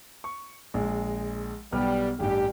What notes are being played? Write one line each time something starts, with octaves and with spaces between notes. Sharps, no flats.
C#6
A#1 G#3
B1 G3 B3 F6
A1 G2 G4